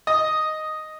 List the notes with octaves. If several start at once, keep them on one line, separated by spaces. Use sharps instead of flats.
D#5